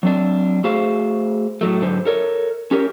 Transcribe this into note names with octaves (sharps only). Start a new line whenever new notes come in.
F#3 C4 D4
A3 F#4 G#4 C5 F5
A2 F#3 A3
G#2 D3 F#3 B4 C5
A4 A#4 C#5
C#4 G4 A#4 C#5